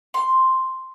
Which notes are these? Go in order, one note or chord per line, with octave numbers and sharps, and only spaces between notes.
C6